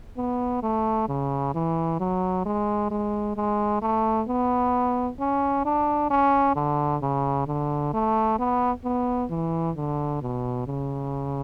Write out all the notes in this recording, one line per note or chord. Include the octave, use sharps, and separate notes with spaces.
B3
A3
C#3
E3
F#3
G#3
G#3
G#3
A3
B3
C#4
D4
C#4
D3
C#3
D3
A3
B3
B3
E3
D3
B2
C#3